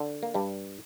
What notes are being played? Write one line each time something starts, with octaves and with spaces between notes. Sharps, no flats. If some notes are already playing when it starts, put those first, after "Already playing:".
Already playing: D3
A#3
G2 G3